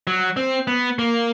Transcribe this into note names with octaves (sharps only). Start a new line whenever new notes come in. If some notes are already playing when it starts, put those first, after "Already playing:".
F#3
C4
B3
A#3